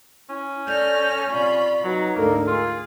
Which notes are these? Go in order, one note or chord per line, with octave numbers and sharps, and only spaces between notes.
C#4 E4
A4 D5 F6 G6 A#6
C3 F4 D5 B5 C#6
F#3 D#4 F#4 B4
D2 G#2 A#3 D4 A4 A#4
F4 G#4